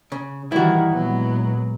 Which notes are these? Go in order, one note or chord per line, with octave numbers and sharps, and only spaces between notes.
C#3
D#3 E3 G3 E4 F#4
A#2 F#3 G#3 B3